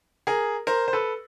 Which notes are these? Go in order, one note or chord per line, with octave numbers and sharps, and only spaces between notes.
G#4 A#4
A#4 C5
C5
A4 B4